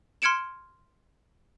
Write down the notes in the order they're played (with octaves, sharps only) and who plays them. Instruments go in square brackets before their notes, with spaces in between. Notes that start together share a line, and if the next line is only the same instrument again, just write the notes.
[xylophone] C6 F6 G#6 C#7 D7 E7